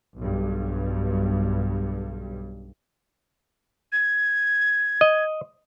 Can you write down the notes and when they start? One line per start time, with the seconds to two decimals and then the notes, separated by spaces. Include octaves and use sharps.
0.19 B1 G2
3.92 G#6
5.01 D#5